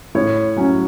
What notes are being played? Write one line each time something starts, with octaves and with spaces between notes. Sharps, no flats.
A2 C#5
F#3 C#4